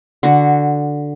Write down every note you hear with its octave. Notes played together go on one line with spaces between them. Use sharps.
D3 F#4